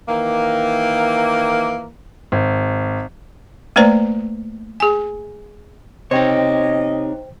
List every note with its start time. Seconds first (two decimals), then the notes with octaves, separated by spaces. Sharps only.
0.08 D#3 E3 A#3
2.32 G#1
3.76 A3 A#3 B4 C5 D5 A#5
4.80 G#4 G#5
6.11 C3 D#4 C5 C#5 D#5 G5